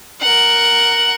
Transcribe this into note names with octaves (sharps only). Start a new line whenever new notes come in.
A#4 F#5